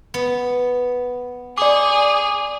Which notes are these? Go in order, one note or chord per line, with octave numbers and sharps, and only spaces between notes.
B3
G#4 D5 D6